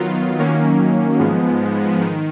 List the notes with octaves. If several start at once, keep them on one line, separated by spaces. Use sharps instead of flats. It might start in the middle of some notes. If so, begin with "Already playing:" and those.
Already playing: D#3 F#3 B3 F4
D#3 F#3 A#3 C#4
G#2 F3 G#3 B3
D#3